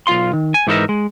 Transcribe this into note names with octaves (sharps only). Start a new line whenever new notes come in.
B1 F4 F5 C6
D#3
G#5
G#2 E3 D#4 E4 A#4 E5
G#3